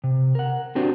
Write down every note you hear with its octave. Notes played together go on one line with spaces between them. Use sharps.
C3
A#4 F#5
C4 D4 F#4 G4 C5 D5